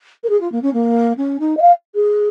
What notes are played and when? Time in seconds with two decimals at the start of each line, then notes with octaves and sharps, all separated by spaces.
0.23 A#4
0.29 G#4
0.40 F4
0.52 A#3
0.62 C#4
0.73 A#3
1.17 C#4
1.39 D#4
1.57 D#5
1.61 F5
1.95 G#4